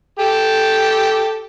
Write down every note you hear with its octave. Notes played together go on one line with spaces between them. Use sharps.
G4 A4